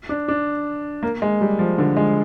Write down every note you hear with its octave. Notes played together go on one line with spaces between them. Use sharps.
D4
D4
A#3
G#3
G3
F3
D3
G#3